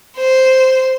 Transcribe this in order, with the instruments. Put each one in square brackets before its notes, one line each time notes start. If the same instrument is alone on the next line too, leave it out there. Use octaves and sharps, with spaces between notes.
[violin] C5